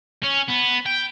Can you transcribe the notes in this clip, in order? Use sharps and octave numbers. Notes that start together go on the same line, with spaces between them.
C#4
B3
G5